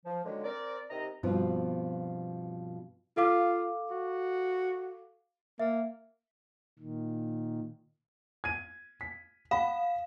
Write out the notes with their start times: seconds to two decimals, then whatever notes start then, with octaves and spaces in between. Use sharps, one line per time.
0.05 F3
0.24 A#2 D3 D#3 F#3 G#3
0.44 C4 A#4 D5
0.90 C3 D#3 D#5 A#5
1.23 G2 B2 F3 B3 C4 F4
3.17 F4 A4 F5 D6
3.90 F#4
5.59 A#3 E5
6.79 A#2 D#3
8.44 G#6 D#7
9.01 B6
9.51 F5 F#5 B5